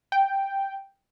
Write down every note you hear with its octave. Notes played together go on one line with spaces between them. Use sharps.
G5